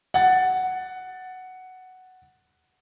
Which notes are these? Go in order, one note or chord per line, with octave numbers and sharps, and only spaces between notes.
F#5 A6